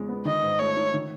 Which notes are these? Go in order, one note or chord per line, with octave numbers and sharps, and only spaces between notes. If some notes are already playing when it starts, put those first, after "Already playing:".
Already playing: E2 C#3 G#3
B3
D#3 D#5
G#2
A3 C#5
D#4
D#3